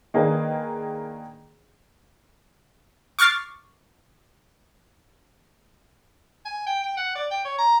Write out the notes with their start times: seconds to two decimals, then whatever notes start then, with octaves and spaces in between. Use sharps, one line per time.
0.14 D#3 A#3 D4 D#4 G#4 B4
3.19 C#6 D6 F6 A6 C7
6.45 G#5
6.67 G5
6.83 G5
6.97 F#5
7.15 D5
7.31 G5
7.45 C#5
7.58 A#5